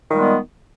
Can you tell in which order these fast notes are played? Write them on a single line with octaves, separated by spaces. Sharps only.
D#3 A#2 G3 G#3 B3